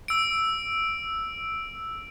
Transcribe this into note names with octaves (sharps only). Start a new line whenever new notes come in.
E6 D7